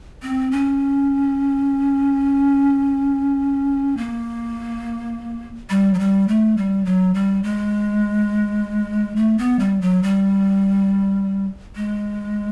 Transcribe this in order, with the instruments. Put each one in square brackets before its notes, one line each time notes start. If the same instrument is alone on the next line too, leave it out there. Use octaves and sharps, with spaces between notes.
[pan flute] C4
C#4
A#3
G3
F#3
G3
A3
G3
F#3
G3
G#3
A3
B3
G3
F#3
G3
G#3